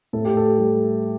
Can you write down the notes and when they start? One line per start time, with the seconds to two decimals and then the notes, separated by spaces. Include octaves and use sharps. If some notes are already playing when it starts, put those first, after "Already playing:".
0.13 A2 A4
0.25 G4
0.37 A4
0.58 G3